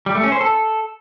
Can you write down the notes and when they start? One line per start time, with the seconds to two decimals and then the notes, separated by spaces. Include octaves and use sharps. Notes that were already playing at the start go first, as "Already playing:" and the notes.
0.06 G3
0.15 A3
0.23 C#4
0.32 C5
0.41 A4